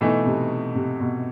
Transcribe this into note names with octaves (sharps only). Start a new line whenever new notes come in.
B2 E3 A3 D#4
C3
C3
B2